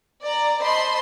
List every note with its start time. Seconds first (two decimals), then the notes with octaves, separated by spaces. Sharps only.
0.23 D5 A#5
0.62 C5 D#5 A5 B5 C6